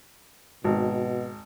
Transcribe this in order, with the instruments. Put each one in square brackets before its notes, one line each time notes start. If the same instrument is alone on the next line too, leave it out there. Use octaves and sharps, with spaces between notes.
[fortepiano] G#1 [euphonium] B2